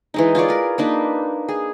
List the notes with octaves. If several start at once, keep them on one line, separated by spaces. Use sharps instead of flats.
E3 G#3 D#4
F4 G#4 C#5 D5
A#4 B4
A#3 D4 D#4 B4
G#4